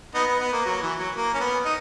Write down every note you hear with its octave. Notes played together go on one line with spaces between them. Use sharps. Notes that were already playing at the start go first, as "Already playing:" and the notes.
B3 D#4
B3
B3
A#3
F#3
E3
F#3
A#3
C#4
B3
D#4